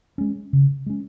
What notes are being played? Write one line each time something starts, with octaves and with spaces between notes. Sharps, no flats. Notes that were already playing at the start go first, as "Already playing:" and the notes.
G#3 C#4
C#3
G#3 C#4